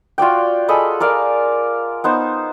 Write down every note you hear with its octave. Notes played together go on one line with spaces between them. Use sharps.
F4 F#4 D5 G5
G#4 A4 D#5 B5
A#4 D5 F5
B3 D#4 C5